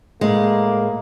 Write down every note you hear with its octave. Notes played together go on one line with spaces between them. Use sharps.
A2 G#3 A#3